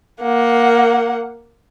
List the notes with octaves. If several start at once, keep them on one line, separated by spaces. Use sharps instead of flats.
A#3 F#5